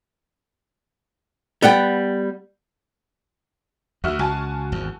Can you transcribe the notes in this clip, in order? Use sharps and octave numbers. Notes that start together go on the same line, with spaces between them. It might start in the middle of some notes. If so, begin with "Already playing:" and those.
G3 B3 F#5 G5
D2 F#4 E5 F6
C#2 F#4 G#5 A5
G#1 E2